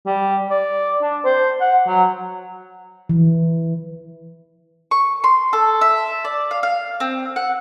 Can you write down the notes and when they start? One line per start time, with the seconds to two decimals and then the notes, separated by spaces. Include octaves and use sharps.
0.06 G3
0.50 D5
1.02 D4
1.25 C5
1.60 F#5
1.87 F#3
3.09 E3
4.91 C#6
5.24 C6
5.53 A4
5.81 E5
6.25 D5
6.51 F5
6.63 F5
7.00 C4
7.36 F#5